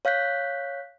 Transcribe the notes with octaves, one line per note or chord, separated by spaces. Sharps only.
C#5 F5 F#6 G6 B6